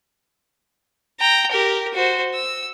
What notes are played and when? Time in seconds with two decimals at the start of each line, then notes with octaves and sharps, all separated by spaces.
1.20 G5 A#5
1.52 G4 A#4
1.94 F#4 C5
2.34 E6